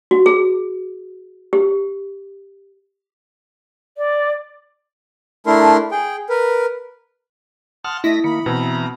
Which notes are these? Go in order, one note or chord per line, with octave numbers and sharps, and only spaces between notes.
F#4
G#4
G4
D5
A3 D4 E4 A#4 C6
G#4 G5
A#4 B4
F#5 A5 C6 D#6 F6
A3 E4 D#5 A#6 B6
D#3 A#3 B5 C#7
B2 E3 C4 A#5